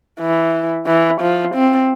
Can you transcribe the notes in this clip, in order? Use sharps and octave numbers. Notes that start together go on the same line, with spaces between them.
E3
E3
F3
C4